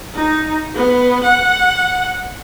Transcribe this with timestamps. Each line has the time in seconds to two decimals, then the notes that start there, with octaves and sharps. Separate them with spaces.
0.15 D#4
0.75 B3
1.23 F#5